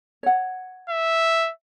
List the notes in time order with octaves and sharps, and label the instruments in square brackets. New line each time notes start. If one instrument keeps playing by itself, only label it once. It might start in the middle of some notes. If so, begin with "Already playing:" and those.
[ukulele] C#5 F#5
[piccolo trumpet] E5